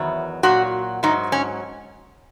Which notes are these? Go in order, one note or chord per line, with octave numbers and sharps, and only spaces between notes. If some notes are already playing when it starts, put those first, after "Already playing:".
Already playing: E2 D#3 F#3
A#2 F#3 F#4
G#2 F#3 D#4
C#4